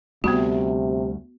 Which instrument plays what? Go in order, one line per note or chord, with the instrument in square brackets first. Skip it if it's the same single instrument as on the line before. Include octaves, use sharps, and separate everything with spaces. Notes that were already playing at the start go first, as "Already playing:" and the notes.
[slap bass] D2 G3 A3 [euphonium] C3 [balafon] B3 F#4